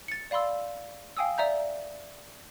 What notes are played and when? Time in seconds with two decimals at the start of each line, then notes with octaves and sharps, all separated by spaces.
0.08 A6 C#7
0.31 D5 F5 B5 C6 E6
1.17 F5 G5 G#5 D#6 E6
1.38 D5 E5 A#5 G6